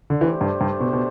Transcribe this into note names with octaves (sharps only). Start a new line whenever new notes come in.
D3
E3 A3 D4 G4 C5
G2
G2
B2
B2